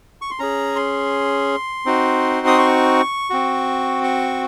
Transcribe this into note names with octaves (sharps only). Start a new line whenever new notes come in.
C#6
C6
C#4 G#4 A#5
C6
C4 D#4 F#4
D#6
C#6
C4 F#4
C#6